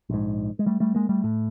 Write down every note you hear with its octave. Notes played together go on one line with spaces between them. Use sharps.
A#1 G#2
G#3
G3 A3
G3 A3
G#3 A#3
G3 A3
A2